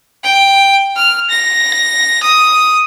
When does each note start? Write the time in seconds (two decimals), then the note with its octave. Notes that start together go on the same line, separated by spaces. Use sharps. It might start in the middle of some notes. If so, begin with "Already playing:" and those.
0.24 G5
0.96 F6
1.30 A#6
2.23 D#6